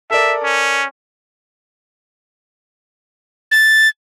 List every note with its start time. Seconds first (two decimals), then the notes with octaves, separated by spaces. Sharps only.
0.11 A4 A#4 D5 E5
0.43 C#4
3.51 A6